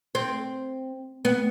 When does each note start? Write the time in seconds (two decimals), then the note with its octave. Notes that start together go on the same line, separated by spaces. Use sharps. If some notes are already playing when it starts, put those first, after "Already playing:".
0.15 C4
1.25 B3